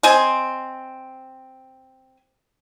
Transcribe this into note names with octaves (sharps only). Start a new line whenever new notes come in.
C4 D#5 G#5